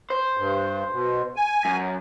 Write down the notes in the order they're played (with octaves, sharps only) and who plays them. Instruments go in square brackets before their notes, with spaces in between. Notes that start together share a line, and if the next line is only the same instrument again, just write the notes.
[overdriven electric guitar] C5
[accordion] G2
B2
G#5
[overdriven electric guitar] F#2